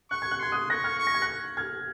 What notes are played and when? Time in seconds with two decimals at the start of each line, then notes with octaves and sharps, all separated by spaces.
0.11 C#6 F#6
0.22 G#6
0.31 F#6
0.40 C6 G#6
0.52 D#6 F#6
0.70 C#6 F#6 A#6
0.84 F6 G#6
0.99 C#6
1.07 A#6
1.14 G#6
1.22 F#6 A#6
1.57 F6 G#6